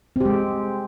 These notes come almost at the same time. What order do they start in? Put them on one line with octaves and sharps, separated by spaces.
C4 G4 G#3